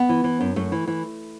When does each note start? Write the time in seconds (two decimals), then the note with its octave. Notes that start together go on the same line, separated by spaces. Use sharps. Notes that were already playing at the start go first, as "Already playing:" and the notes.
Already playing: B3
0.09 E3
0.24 E3
0.41 F#2
0.56 F#2 A3
0.72 E3
0.87 E3